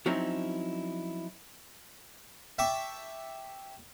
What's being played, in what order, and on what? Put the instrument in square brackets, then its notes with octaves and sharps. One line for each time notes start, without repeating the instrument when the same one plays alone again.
[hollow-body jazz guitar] F3 F#3 C4 C#4 D#4 E4
[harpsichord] E5 G5 A5 C#6 D6